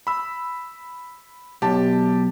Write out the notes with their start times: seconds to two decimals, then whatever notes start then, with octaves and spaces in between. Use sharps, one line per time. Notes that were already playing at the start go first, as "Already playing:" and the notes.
0.07 B5 E6
1.62 B1 G4 A5